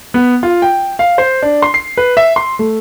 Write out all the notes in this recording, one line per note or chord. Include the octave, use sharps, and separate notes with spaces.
B3
F4
G5
F5
C5
D4
C6
C7
B4
E5
C6
A3